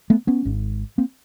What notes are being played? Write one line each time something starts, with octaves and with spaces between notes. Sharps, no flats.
A3 B3
B3 C#4
G#1 G#2
A#3 C4